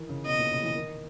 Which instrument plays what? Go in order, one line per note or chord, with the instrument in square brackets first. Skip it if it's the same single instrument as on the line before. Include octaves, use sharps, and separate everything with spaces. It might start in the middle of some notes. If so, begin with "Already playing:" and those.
Already playing: [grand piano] D#3 E3
C#3
[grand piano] B2 [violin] D#5
[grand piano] A#2
C#3
E3
D#3